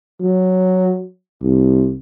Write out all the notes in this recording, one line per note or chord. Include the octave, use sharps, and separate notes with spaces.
F#3
C2